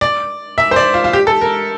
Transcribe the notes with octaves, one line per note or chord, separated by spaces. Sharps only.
D5
E5
C5
D5
F4
F4
G4
A4
A#4